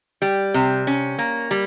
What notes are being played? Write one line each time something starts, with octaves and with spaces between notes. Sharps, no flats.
G3
C3
C#4
A#3
G3